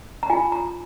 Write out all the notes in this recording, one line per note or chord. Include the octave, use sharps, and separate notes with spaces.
A#5
F4 G#5
A#5